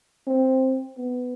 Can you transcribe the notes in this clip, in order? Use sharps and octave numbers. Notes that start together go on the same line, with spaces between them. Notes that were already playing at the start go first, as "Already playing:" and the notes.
C4
B3